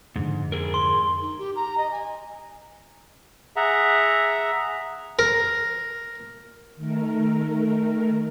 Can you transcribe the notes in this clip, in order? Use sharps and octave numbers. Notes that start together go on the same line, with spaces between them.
F2 G#2 D3
G#2 G#4 A#4
C6
D#4
G4
A#5
D#5
G#5
G#4 E5 F#5 A#5
A#4
D#3 A3 A#4